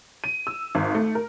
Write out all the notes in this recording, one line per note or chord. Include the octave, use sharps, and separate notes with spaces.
D#7
E6
G#1
A3
A#4